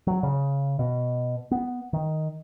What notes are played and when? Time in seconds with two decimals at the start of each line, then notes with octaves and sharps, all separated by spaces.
0.07 F#3
0.23 C#3
0.79 B2
1.51 B3
1.93 D#3